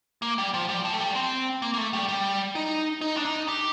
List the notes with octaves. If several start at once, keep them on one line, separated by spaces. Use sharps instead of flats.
A#3
G3
F3
G3
F3
A3
G3
C4
A#3
A#3
A3
G3
G3
D#4
D#4
D4
D#4
G4